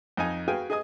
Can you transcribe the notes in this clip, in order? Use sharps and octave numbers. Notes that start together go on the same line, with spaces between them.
F2 D#4 G#5
F#4 G#4 B4 F5 G5 G#5
G#4 D#5 G#5 D#6